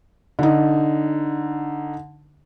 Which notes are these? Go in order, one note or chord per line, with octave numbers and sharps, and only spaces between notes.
D3 D#4